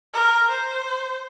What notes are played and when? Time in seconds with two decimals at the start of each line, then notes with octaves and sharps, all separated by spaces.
0.13 A#4
0.50 C5